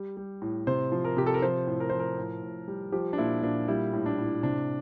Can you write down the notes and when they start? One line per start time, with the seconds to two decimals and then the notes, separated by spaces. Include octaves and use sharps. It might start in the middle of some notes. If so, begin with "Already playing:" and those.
Already playing: G3
0.17 G3
0.42 A2
0.67 C3 C5
0.92 F3
1.05 A#4
1.17 C3 G4
1.26 A4
1.34 A#4
1.42 F3 C5
1.67 A2
1.80 A#4
1.90 F3 C5
1.99 A#4
2.18 A2
2.43 A2
2.68 G3
2.92 F3 G4
3.13 D4
3.18 A#2 E4
3.43 A#2 D4
3.68 G3 E4
3.93 A2
4.06 D4
4.19 A2
4.43 C3 D4